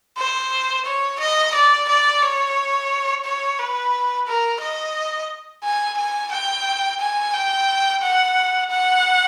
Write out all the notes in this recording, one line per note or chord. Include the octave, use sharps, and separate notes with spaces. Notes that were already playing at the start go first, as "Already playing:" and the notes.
C5
C#5
D#5
D5
D5
C#5
C#5
B4
A#4
D#5
G#5
G#5
G5
G#5
G5
F#5
F#5